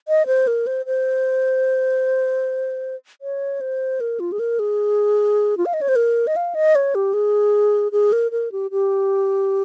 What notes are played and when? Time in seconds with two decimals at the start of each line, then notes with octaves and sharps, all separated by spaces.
0.08 D#5
0.27 C5
0.47 A#4
0.67 C5
0.86 C5
3.21 C#5
3.61 C5
4.00 A#4
4.20 F4
4.32 G#4
4.39 A#4
4.59 G#4
5.57 F4
5.66 F5
5.74 D#5
5.81 C#5
5.88 C5
5.96 A#4
6.27 D#5
6.36 F5
6.55 D#5
6.75 C#5
6.95 G4
7.13 G#4
7.92 G#4
8.12 A#4
8.31 A#4
8.52 G4
8.71 G4